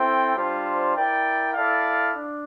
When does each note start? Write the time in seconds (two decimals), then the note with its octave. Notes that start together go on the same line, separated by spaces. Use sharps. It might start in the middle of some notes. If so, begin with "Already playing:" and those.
Already playing: C4 E4 A4 C5 G5
0.36 G3 D4 F4 C5
0.95 E4 A#4 D5 G5
1.54 E4 A4 D5 F5
2.14 D4